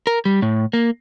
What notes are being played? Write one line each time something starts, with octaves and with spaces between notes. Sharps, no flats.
A#4
G3
A2
A#3